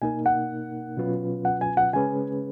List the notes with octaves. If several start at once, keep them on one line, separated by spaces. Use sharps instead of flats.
B2 A#3 D#4 A#4 G#5
F#5
B2 F#3 C#4 F4 B4
F#5
G#5
F#5
C#3 G#3 C#4 G#4 B4 G#5